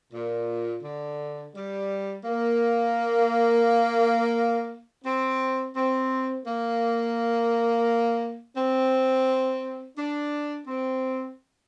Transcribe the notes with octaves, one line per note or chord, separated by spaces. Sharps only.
A#2
D3
G3
A#3
C4
C4
A#3
C4
D4
C4